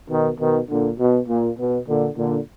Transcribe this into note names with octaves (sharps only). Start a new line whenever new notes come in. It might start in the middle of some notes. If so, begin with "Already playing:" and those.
B2 D#3
B2 D#3
A#2 D3
B2
A#2
B2
A#2 D3
A#2 D3